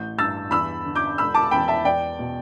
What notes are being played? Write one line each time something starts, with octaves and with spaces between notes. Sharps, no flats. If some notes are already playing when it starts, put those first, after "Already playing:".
Already playing: A1 G6
G2 E6 A6
E2 B5 E6
D3
D6 G6
E1 B5 E6
A5 D6
E2 G5 B5
E5 A5
E2 D5 G5
B2